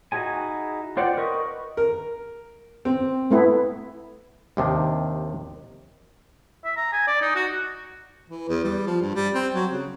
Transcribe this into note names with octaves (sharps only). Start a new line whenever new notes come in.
D#4 E4 F#4 G#4 G#5
F4 C5 D5 F#5 G5
A#4 B4 D#5 C#6
A#4
C4
A3 B3 E4
D#2 C3 D#3 D4
E5
A#5
G#5
D5
D#4
F#4
E3
E2
G3
F3
G2
G3
C4
F#3
C#3